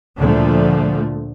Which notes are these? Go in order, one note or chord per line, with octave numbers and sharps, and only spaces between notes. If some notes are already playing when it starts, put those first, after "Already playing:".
D2 A#2 D3 F3 A3